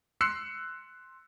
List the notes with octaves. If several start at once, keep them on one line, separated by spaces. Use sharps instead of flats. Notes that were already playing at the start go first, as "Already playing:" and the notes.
C6 E6 F#6 C7 C#7